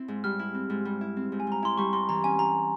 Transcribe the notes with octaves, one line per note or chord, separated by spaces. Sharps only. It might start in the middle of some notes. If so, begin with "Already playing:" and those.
Already playing: C4 E4
G#2
G3 F6
E4
C4
G#2
G3
E4
C4
G#2
G#5
G3
A#5
E4 C6
G3 C#6
G2 C6
E3 A#5
C#4 G#5
G3 A#5